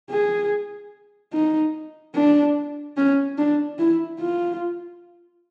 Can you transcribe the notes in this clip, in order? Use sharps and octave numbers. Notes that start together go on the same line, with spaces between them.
G#4
D#4
D4
C#4
D4
E4
F4